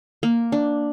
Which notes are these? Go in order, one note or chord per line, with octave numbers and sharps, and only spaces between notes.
A#3
D4